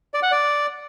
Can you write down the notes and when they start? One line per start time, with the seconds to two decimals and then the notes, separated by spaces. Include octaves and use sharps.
0.14 D5
0.23 F#5
0.32 D5